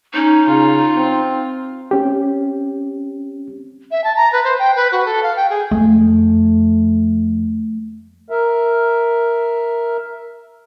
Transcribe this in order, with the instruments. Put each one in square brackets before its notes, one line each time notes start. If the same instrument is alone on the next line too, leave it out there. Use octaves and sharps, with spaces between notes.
[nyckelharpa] C#4 [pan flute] D#4
[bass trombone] C#3 [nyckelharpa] F4
[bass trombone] C4
[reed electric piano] C4 C#4 G4
[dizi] E5
A5
A#5
B4
C5
G5
B4
F#4
A4
F5
G5
G#4
[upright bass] F2 [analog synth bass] A3
[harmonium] A#4 E5